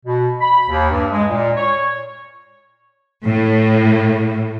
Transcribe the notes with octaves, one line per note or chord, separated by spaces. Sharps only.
B2
B5
D#2
G2
G#3
A#2
C#5
A2